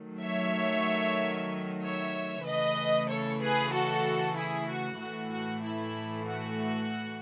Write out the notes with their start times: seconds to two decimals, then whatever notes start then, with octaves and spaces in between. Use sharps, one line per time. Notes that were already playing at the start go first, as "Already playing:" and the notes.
Already playing: D#3 F#3 A3
0.23 C#5 E5
1.82 C#5 E5
2.44 C#3 E3 A3 B4 D#5
3.08 A4 C#5
3.40 G#4 B4
3.72 F#4 A4
4.34 E4 G#4
4.67 F#4
4.98 A2 E3 A3 F#4
5.30 F#4
5.62 E4
6.25 F#4